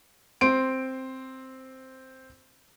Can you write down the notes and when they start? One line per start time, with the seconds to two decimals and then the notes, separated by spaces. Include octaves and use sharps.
0.41 C4 C6 D7